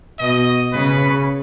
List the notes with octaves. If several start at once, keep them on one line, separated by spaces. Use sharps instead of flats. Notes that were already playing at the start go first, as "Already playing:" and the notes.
B2 D#5
C#3 B4